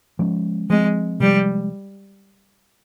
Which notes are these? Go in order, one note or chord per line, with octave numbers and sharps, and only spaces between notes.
F3 G#3 C#4
F3 G#3 C4
C3 F3 G3 G#3